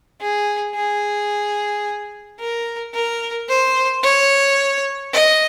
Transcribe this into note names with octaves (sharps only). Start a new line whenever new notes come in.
G#4
G#4
A#4
A#4
C5
C#5
D#5